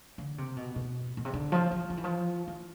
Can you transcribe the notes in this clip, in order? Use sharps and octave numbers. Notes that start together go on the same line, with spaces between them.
D3
C3
B2
B2
B2
C3
D3
F3
F3
F3
E3
F3
E3